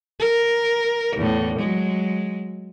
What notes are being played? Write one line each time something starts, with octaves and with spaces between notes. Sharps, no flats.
A#4
E2 A2
F#3 G#3